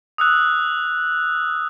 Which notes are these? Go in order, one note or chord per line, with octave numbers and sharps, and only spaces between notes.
D#6 E6 F#6